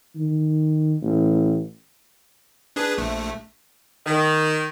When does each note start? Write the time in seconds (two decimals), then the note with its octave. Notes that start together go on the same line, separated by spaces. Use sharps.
0.15 D#3
1.02 A1
2.76 D4 G#4 B4
2.98 A#1 A3
4.06 D#3